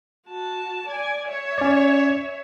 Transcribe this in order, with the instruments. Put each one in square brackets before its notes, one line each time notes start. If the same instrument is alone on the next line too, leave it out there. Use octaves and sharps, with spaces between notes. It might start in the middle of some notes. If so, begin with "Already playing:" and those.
[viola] F#4 A5
D5 G#5
C#5 E5
[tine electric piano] C#4 D5